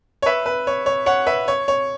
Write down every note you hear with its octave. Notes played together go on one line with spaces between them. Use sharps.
C#5
B4 E5
B4
C#5
C#5
C#5 F#5
B4 E5
C#5
C#5